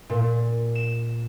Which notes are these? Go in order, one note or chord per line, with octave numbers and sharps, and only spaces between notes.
A#2
E7